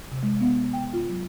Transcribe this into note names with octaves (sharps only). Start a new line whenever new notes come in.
C3
G#3
B3
G5
F4
F#3